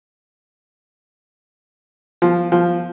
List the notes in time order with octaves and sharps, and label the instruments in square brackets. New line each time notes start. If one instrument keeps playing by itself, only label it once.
[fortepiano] F3
F3